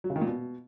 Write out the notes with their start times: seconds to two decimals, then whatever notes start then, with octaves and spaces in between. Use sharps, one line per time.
0.04 F#3
0.10 C#3
0.16 D#3
0.21 A#2
0.27 B2